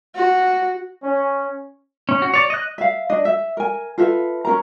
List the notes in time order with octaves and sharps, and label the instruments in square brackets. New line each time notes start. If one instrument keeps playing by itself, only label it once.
[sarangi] F#4
[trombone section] C#4
[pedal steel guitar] C#4
F#4
C#5 D5
D#5 F#6
[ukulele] E5 F5
D4 D#5
E5
A#4 G#5
F4 A4 B4 E5
C#4 D#4 A#4 A#5